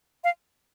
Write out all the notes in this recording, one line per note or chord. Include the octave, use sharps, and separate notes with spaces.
F5